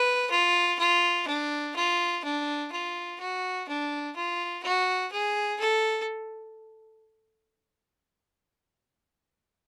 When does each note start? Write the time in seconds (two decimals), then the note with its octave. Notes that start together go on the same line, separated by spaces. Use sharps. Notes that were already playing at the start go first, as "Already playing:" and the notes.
Already playing: B4
0.31 F4
0.79 F4
1.27 D4
1.75 F4
2.24 D4
2.72 F4
3.20 F#4
3.68 D4
4.16 F4
4.63 F#4
5.12 G#4
5.59 A4